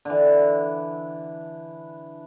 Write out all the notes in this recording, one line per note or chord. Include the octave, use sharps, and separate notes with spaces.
D3 E3